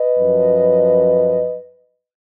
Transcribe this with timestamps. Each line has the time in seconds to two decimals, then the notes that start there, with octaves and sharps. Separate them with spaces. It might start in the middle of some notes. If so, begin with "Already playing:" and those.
Already playing: B4 D#5
0.19 F#2 F3